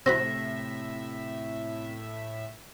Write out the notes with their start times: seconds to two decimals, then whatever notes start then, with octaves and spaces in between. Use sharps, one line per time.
0.06 A2 C3 C4 F#4 E5 B5 A#6